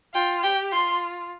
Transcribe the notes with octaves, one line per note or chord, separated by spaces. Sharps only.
F4 G5
G4 G5
F4 C6